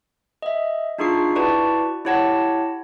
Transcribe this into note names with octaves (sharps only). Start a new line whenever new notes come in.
D#5 E5
D4 D#4 F4 G#4 C#6 C7
E4 F#4 B4 D5 A5 C#6
E4 G4 C#5 F#5 A5 A#6